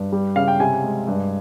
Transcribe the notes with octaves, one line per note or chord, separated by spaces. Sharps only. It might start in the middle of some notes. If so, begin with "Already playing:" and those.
Already playing: G2
G3
C#3 F5
G5
C3 G#5
G#3
G2